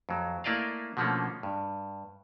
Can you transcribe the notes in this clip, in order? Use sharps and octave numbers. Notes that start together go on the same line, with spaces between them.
F2 F#3
A3 A#3 E4 D5 D#5 F5
B2 D3 F3 A3 A#3 C#4
G2